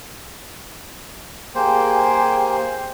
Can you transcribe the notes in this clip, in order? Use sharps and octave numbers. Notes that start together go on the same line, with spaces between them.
A#3 G4 G#4 C5 G5 G#5